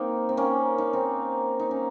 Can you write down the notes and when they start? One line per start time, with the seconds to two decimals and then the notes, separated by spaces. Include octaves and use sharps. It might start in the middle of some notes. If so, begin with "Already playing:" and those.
Already playing: A#3 C4 D#4
0.29 C4
0.37 A#3 C#4
0.78 D#4
0.93 C4 D#4
1.60 D#4
1.71 C#4